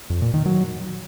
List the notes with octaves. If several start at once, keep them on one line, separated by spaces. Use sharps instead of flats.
F2
A#2
D#3
F#3